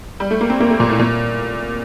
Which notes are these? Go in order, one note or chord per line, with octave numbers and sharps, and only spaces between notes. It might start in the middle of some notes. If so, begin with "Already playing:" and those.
G3
A3
A#3
C4
A#3
A3
A#2
A2
A#2